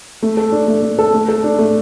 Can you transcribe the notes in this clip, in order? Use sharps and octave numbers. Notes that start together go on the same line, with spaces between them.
A3
A4
D4
A3
A3
A4
A3
A4
D4
A3